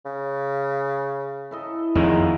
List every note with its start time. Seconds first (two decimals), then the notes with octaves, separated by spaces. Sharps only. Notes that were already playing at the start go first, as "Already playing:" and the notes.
0.06 C#3
1.51 E4 A4 D#5
1.95 F2 A#2 D#3 F#3 G#3